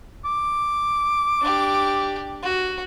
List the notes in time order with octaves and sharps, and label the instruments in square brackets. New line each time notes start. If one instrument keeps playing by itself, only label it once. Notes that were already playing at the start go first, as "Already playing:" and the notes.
[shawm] D6
[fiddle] D4 G4
F#4